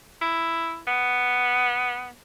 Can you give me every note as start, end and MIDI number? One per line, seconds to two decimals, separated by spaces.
0.21 0.79 64
0.87 2.10 59